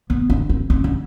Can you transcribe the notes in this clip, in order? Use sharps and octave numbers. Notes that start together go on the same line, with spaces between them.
B3
D4
C4
C4
C#4